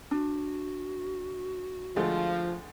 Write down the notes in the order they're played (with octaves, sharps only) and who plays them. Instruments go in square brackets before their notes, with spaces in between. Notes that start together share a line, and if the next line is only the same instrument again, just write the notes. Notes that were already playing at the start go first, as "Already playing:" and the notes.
[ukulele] D4 [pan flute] F#4
[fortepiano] D2 G#3 A3 [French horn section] F3